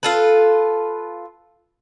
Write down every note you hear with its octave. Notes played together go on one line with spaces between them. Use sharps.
F4 A4 B4